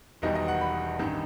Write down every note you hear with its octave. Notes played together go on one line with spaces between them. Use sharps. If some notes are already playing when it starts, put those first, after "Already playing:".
E1 E2 D#3 G3 D#5
D#5
F#5
B5
A1 G2 D#3